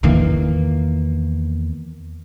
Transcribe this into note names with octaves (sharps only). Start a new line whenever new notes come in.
E2 D#3 E3 A#3